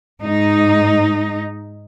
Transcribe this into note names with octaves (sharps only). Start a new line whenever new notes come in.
G#2 D#4